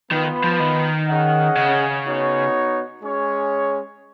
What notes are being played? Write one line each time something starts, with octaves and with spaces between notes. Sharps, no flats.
D#3 B3 F4 B4
F3
D#3
C#4 G#4 D#5 F#5
C#3
B3 D#4 F#4 C#5
G#3 C#4 G#4 C#5